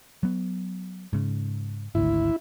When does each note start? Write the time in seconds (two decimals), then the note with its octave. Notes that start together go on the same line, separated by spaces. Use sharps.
0.23 F#3 B3
1.13 G#2 C#3
1.95 G#1 D2 E4